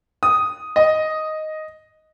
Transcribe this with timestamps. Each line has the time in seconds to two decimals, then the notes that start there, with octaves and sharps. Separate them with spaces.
0.23 D#6
0.76 D#5